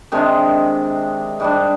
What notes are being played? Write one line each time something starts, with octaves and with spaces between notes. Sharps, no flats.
C3 D#3 G#3 D4
G#2 G3 D4